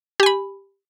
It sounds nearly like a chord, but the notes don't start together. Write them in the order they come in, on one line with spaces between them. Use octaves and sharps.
G4 G#5 B5